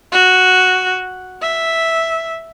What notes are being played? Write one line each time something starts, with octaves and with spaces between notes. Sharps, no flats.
F#4
E5